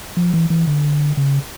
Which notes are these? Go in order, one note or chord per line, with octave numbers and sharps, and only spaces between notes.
F3
E3
E3
D3
C#3